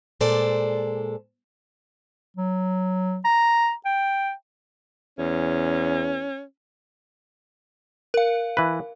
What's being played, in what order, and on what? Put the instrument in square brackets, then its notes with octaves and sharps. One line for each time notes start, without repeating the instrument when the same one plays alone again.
[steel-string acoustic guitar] A#2 G#3 A4 C5 D5
[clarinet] F#3
A#5
G5
[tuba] E2 [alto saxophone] C#4
[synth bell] A#4 F5
[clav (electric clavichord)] E3 B4